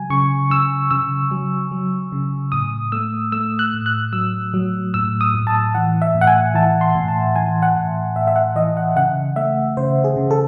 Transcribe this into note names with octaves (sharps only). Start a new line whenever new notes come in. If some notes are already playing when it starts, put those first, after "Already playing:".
Already playing: C#3 F#3 G#5
C#3 C#6
C#3 E6
C#3 E6
F#3
F#3
C#3
A2 D#6
A3 E6
A3 E6
F#6
A2
F#6
F#3 E6
F#3
A2 E6
D#6
A2
A5
E3 F#5
E5
A2
F#5
G#5
E3 A5
C6
A2
A5
E3 G#5
F#5
A2
A2 E5
E5
F#5
E3 D#5
F#5
C#3 F#5
A3 E5
C#3 C5
G#4
C#3
A4